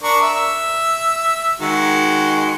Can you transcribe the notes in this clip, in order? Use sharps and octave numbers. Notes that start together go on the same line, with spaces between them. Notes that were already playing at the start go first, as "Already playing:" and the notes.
D4 A#4 C#6
E5
D#3 G#3 F#4